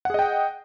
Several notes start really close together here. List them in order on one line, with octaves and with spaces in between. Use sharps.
F#5 G#4 D#5 G5